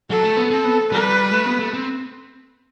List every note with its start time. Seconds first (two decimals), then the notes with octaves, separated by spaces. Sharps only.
0.10 F#3 A4
0.23 A3
0.37 B3
0.50 C4 A4
0.64 B3
0.92 G3 B4
1.32 A3
1.46 B3
1.60 A3
1.74 C4